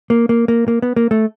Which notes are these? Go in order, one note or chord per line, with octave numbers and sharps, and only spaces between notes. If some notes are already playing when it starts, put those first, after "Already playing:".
A#3
A#3
A#3
A#3
B3
A#3
A3